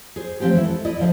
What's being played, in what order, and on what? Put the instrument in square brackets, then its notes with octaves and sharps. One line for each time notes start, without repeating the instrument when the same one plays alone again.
[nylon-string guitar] G#4 C5
F3 A3 C4 C#4 G4
E3 G#3 E4
A4
E4 D5 D#5
D3 F3 E4